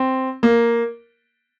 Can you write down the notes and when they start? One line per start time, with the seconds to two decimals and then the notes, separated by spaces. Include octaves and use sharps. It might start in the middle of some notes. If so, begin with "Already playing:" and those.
Already playing: C4
0.43 A#3